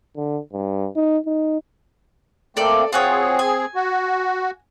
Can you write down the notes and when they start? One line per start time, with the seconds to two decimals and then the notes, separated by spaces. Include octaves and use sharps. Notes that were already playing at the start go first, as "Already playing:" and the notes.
0.16 D3
0.53 G2
0.96 D#4
1.26 D#4
2.57 A3 A#3 C4 A4 D5
2.93 C4 F4 F#4 G#4 C#5
3.39 G#5
3.75 F#4